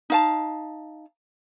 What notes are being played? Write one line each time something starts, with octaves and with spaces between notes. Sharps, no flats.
D#4 F5 A5